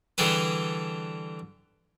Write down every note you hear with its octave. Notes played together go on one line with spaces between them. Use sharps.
D3 E3 G3 G#4 A4 B4